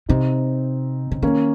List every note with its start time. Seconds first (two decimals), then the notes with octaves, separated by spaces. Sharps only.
0.08 C3 C4 D#4
1.12 C#3
1.22 D#3 A#3 C#4